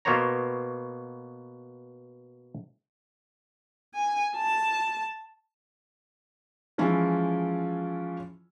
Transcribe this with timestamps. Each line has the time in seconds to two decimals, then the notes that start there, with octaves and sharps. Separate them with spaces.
0.05 B2 A#3 B3 C5 C#5 A#5
3.95 G#5
4.37 A5
6.78 E3 F3 G#3 C#4 E4 F4